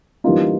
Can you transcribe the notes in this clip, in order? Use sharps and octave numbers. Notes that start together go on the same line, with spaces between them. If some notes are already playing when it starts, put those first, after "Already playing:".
E3 G3 A#3 C#4 D#4 F4